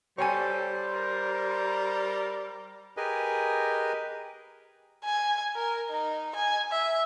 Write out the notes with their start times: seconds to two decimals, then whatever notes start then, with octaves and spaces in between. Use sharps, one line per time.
0.18 G3 A4 C5 C#5 G5 G#5
0.94 A#4
2.97 G4 G#4 A#4 B4 D#5 G#5
5.05 G#5
5.55 A#4
5.90 D#4
6.36 G#5
6.72 E5